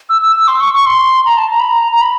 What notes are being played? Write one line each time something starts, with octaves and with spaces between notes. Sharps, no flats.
E6
E6
E6
C6
C#6
C#6
C6
A#5
A5
A#5
B5
A#5
A#5
B5